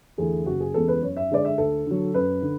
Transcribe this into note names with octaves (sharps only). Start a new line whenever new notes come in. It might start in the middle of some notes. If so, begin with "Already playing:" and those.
E2 D3 A3 G#4
F#1 F#4
G#4
E2 C#3 G#3 B3 A4
B4
F#2 C#5
E5
D3 G#3 D5
E5
D2 A4
D3 F#3
F#2 B4
D3